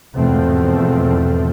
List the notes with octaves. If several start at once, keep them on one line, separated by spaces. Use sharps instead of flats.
E2 G#2 B2 F3 A3 C4